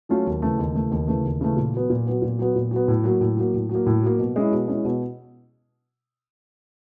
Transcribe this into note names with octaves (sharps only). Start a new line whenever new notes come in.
F#3 A3 C#4 F4
D#2
C#3 E3 A3
D#2
C#3 E3 A3
D#2
C#3 E3 A3
D#2
C#3 E3 A3
A#2
F#3 B3
A#2
F#3 B3
A#2
F#3 B3
A#2
F#3 B3
A2
F#3 A#3
A2
F#3 A#3
A2
F#3
A#3
A2
F#3 A#3
B2
G#3 C#4 E4
B2
G#3 C#4 E4
B2